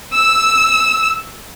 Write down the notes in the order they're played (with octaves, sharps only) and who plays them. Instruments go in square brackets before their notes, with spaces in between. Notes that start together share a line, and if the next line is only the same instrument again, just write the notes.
[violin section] E6